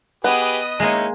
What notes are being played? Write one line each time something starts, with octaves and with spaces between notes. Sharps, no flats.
B3 G4 G#4 B4 D#5 D#6
G#3 A#3 C#4 D#4 E4